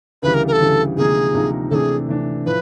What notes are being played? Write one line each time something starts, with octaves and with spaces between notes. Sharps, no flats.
D2 C#3 E3 G3 B4
A#4
A#4
A4
D2 C#3 E3 G3
D2 C3 F3 A#3 D#4 G#4
D2 C3 F3 A#3 D#4
C3 E3 A3 D4 G#4 A4
C3 E3 A3 D4
A2 F3 B4